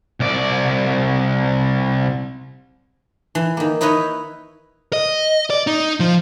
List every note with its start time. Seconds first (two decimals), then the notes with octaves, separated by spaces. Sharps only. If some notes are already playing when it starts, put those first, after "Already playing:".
0.20 C2 D5
3.35 E3
3.57 D#3 A#3
3.81 D#4 E4 B4 C#5 D#5
4.93 D#5
5.50 D5
5.67 D#4
6.00 F3